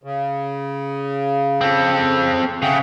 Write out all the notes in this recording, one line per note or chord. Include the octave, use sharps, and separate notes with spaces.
C#3
C4 A4
C#3 E5 F#5 G5